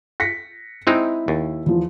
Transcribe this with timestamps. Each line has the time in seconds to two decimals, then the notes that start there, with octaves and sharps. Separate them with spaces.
0.20 A#6 B6 C#7
0.87 G#3 C4 D#4 E4
1.28 D#2
1.66 E2 F3